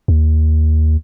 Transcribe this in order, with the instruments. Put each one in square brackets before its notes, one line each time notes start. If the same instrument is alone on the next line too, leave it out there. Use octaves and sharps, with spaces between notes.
[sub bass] D#2